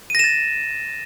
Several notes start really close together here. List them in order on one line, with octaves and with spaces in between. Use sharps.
D#7 A#6 E7 A6